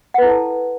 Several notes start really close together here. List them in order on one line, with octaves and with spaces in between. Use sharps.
F#5 B4 E4 A4 A5